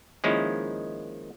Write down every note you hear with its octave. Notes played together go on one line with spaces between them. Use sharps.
D#3 F3 G#3 A#3 C#4 E4